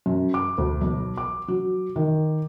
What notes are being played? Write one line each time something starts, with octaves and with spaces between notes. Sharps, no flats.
F#2
D6
D2
B1
D6
F#3
D#3